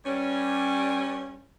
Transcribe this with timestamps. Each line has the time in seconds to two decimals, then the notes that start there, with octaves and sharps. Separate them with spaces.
0.05 G2 G3 C#4